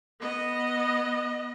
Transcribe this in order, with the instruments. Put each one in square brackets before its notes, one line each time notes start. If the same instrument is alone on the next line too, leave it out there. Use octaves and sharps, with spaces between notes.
[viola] B3 D#5